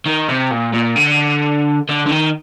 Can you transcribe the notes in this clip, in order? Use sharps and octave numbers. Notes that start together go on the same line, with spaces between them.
D#3
C3
A#2
A#2
D3
D3
D3
D#3